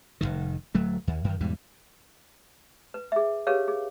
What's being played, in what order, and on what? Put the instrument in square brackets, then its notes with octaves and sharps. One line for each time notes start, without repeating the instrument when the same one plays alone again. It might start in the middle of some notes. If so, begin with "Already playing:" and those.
[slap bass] F1 B1 D#3
D1 F#3 A3
D#2
F#2 D#3
E2 G#2 B2 G3
[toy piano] B4
G#4 E5
G4 G#4 A#4 B4 C#5 F5
G#4